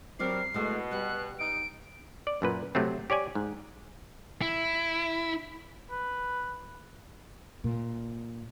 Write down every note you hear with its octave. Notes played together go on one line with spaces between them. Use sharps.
F#3 G3 C4 D4 A#4 D5 C7
B2 G#3 A3 E4
G3 B3 F#6
D#4 D7
D5
F#2 A#2 B4
C3 F#3 A3 C4
G4 C#5 D5 G#5
G#2
E4
B4
A#2